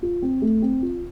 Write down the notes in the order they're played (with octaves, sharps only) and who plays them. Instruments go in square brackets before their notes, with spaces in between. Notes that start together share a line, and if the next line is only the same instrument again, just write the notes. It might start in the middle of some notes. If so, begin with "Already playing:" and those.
[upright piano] F4
C4
A3
C4
F4